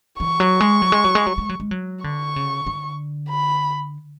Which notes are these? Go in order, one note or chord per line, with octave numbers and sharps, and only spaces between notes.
E3 C#6
F#3
G#3
F#3
G#3
F#3
G#3
F#3
G#3
F#3
G#3
F#3
D3 C#6
C#3
D3
B5